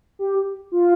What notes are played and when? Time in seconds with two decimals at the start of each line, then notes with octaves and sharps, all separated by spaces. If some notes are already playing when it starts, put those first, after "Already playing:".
0.19 G4
0.72 F4